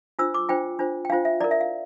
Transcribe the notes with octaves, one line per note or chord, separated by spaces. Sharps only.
D4 F4 C5 E6
D6
D4 F4 C5 G5
D4 F4 C5
G5
D4 F4 C5 F5
E5
E4 A#4 D5
E5
F5